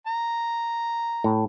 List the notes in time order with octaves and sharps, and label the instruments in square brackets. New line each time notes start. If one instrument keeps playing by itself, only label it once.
[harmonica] A#5
[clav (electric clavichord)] A2